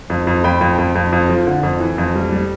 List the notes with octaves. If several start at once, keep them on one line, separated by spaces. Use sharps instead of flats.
F2
F2
F2 G5 B5
F2
F2
F2
F2
F3
D3
F2
E3
F2
G3
G3